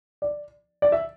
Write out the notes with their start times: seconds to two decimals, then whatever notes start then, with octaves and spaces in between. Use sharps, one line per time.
0.22 D5
0.82 D5
0.92 E5